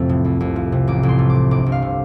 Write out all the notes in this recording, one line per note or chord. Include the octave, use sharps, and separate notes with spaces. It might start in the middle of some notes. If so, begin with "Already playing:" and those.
Already playing: A1 F2 C3 F3 A3 C4
A2
C2
C2
F3
C3
A1 D6
A1
C6
A3
D6
A2
G1 D6
G1
F5
C3